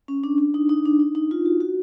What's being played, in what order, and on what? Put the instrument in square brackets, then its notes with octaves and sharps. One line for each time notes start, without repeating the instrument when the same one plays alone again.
[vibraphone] C#4
D4
D4
D#4
D#4
D4
D#4
D#4
F4
F#4
F#4